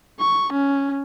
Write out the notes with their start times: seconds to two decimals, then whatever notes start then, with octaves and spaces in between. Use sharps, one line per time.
0.20 C#6
0.53 C#4